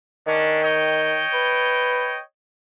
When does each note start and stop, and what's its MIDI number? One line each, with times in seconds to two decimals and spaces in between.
0.27 1.21 51
0.27 0.60 61
0.27 0.60 62
0.63 2.21 73
0.63 2.21 75
0.63 2.21 79
1.33 2.17 71